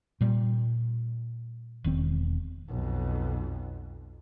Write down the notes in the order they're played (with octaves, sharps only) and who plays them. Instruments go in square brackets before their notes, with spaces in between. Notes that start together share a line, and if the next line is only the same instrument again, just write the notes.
[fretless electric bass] A#2 G3
E1 D#3 C4
[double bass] B1 F2